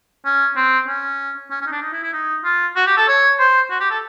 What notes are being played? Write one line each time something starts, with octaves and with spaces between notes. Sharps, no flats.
C#4
C4
C#4
C#4
C#4
D#4
D4
D#4
E4
E4
D#4
F4
F#4
G4
A4
C#5
C5
F#4
G4
A4